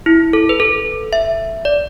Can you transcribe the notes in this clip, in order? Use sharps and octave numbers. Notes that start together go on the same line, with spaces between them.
E4
A4
B4
A4
E5
D5